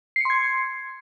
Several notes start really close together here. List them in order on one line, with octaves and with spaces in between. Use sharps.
C7 C#7 C6 G#6